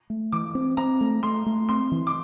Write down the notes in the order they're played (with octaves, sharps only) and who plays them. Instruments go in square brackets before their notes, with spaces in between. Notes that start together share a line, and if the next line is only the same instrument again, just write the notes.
[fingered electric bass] A3
[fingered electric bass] E3 [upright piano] D6
[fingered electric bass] C4
[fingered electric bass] C4 [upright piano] A#5
[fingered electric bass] A3
[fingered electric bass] A3 [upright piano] C6
[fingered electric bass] A3
[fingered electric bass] C4 [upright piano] C6
[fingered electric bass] E3
[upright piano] D6